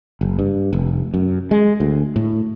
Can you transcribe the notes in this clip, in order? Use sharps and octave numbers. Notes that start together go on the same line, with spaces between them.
F#1
G2
F1
F#2
G#3
D2
A2